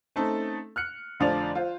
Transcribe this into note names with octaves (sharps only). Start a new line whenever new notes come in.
A3 C4 C#4 D#4 A4
F6 F#6 C#7
F1 D3 F3 C5 D5 F7
F4 C5